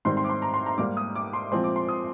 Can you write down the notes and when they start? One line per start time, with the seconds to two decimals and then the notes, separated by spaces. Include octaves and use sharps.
0.05 G#2 D#3 G3 C4 C6
0.17 C6
0.24 D6
0.29 C6
0.42 A#5
0.54 C6
0.66 A#5
0.78 G#2 G3 A#3 D6
0.97 D#6
1.16 D6
1.33 C6
1.52 A#2 F3 G#3 C4 C6
1.64 D6
1.76 C6
1.89 D#6